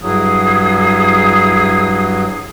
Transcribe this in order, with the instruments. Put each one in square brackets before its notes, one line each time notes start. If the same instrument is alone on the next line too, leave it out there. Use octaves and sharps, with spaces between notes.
[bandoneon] G2 F#3 [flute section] E4 G#4 D#6